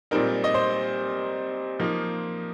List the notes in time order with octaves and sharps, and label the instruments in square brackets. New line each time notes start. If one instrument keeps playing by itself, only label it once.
[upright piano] A#2 G3 C4 D#4 A#4
D#5
C5
F3 A#3 D#4